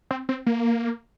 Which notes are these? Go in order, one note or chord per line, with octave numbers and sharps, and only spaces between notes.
C4
C4
A#3